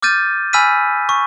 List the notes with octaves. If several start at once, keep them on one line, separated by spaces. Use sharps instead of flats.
D6 F6 G6 A6 D#7
G#5 B5 E6 F6 B6 D#7
C#6